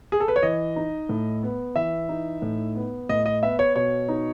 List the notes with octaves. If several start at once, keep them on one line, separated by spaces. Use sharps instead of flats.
G#4
A4
B4
C#5
E3 D#5
D#4
A2
B3
E3 E5
D#4
A2
B3
A2 D#5
D#5
B3 E5
C#5
B2 C#5
D#4